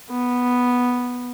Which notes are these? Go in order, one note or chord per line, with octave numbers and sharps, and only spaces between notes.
B3